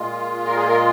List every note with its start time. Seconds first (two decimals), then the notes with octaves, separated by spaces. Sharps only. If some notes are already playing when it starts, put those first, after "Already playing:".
Already playing: A#2 G#3 F4
0.47 A#4
0.56 G#4
0.68 A#4